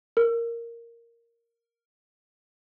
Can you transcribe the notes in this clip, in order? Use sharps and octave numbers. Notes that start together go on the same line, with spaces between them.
A#4